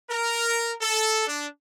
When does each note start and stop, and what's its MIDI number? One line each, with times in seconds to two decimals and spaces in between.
0.10 0.72 70
0.81 1.26 69
1.27 1.47 62